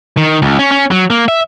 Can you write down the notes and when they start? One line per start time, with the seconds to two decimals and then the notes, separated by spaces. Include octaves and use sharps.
0.17 D#3
0.42 C#2
0.59 C#4
0.71 C#4
0.91 F#3
1.10 A#3
1.28 E5